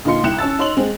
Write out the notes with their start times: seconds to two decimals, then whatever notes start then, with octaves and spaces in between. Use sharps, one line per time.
0.05 A#2 D3 D#4 F4 C6 C#7
0.24 C2 E4 G5 F#6 C#7 E7
0.38 C#4 A5 E6 A6
0.59 D#4 C#5 C6 E6 F7 F#7
0.77 G#3 C4 G#4